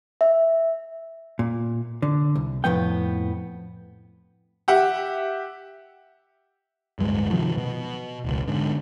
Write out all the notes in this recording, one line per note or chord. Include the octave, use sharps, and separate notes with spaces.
E5
A#2
D3
C2
F2 A2 F3 B3 G5
G4 E5 F#5
D1 G2 G3 G#3
C3 D#3 F3 F#3
B2
E1 C#2
G#2 D3